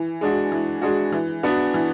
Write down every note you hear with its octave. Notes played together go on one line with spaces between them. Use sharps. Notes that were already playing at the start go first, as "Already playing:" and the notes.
Already playing: E3
G#3 D4 F#4
E3
G#3 D4 F#4
E3
B3 D4 F#4
E3